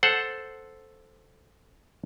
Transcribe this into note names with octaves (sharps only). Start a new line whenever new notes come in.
A4 C5 F#5